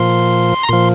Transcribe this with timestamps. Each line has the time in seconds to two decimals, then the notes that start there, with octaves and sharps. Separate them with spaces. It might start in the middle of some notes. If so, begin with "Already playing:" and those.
Already playing: A#2 F3 C6
0.63 A#5
0.69 A#2 F3 C6